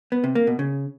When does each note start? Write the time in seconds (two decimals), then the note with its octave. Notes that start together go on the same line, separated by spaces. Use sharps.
0.12 B3
0.24 C3
0.35 A#3
0.47 B2
0.59 C#3